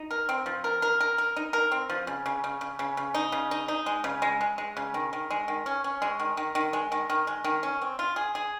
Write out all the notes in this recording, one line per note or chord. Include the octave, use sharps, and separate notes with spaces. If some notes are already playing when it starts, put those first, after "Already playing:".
Already playing: D#4
A#4
C4
F3
A#4
A#4
A#4
A#4
D#4
A#4
C4
F3
C#3
C#3
C#3
C#3
C#3
C#3
D#4
C#3
D#4
D#4
G#3
C#3
G#3
G#3
G#3
C#3
D#3
D#3
G#3
D#3
C#4
C#4
G#3
D#3
D#3
D#3
G#3
D#3
D#3
G#3
D#3
C#4
C4
F4
G#4
G#4